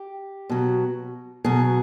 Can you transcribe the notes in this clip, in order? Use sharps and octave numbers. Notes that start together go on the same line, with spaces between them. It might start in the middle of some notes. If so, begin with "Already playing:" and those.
Already playing: G4
B2 F#3
B2 F#3 G#4